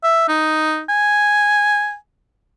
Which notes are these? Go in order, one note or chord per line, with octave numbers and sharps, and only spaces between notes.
E5
D#4
G#5